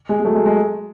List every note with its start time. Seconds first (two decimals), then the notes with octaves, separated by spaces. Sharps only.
0.09 G#3
0.20 G#3
0.24 F#3 A3
0.35 G#3
0.46 G#3